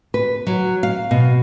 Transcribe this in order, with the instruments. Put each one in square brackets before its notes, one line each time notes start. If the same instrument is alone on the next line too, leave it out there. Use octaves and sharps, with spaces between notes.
[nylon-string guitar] B4
F#3
F5
B2